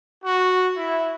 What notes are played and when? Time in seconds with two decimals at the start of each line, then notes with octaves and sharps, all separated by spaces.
0.24 F#4
0.77 E4